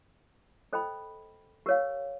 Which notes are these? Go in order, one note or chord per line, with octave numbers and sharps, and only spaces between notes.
A4 C5 D#5 G5 B5
G4 A#4 C#5 F5